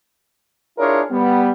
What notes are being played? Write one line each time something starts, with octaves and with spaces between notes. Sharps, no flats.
D4 E4 F4 G#4 A#4 C#5
G3 B3